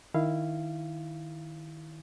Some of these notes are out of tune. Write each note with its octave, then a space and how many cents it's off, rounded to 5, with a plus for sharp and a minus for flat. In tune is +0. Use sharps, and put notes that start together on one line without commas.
D#3 -5 E4 +0 F5 -15